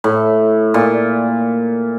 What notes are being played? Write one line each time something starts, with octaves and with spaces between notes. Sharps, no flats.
A2
A#2